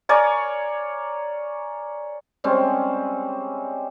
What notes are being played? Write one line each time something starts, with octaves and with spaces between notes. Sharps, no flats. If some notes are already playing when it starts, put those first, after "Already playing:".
A#4 C#5 D5 G#5
G3 G#3 C4 C#4